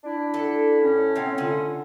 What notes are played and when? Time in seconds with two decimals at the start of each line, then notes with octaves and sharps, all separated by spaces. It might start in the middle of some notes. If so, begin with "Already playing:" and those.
0.04 D4 E4
0.34 A4 F#5
0.81 A2 C#4
1.16 C4 C#5 F#5
1.38 D3 F4 F#5